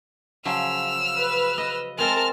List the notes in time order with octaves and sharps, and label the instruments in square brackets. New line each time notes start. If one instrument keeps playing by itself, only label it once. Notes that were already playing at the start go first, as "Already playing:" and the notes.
[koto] C#3 F3 F#3 [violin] E6 F6
[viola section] B4
[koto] D#5
[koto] G#3 C4 [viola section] A#4 A5 [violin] F6